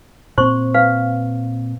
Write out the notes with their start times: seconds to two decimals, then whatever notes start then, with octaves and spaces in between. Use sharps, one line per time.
0.38 A#2 C4 C5 C6 C#6
0.74 B4 F5